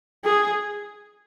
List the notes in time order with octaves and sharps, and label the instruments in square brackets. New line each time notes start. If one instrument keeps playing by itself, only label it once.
[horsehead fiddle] G#4